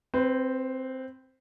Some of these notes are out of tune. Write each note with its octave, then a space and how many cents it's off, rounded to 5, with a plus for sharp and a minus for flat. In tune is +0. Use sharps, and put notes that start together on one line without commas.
C4 +0 B4 +30